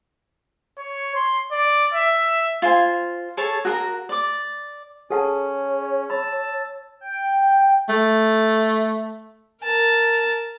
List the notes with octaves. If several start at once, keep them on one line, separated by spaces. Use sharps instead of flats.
C#5
C6
D5
E5
F4 C5 G#5
G#4 A4 C#5 A5
F#4 G#4 A#4
D5 D6
C#4 G#4 A4 C#5 F#5 A5
A5 B5 E6
G5
A3
A#4 A5